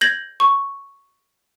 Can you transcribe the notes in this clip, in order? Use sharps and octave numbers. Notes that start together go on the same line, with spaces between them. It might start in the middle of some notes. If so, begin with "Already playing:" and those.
G6 G#6 A#6 F#7
C#6